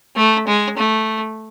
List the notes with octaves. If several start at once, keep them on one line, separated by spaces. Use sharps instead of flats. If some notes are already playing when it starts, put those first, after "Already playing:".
A3
G#3
A3